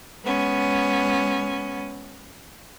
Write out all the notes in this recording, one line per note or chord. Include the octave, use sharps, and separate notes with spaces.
G#3 B3 C#4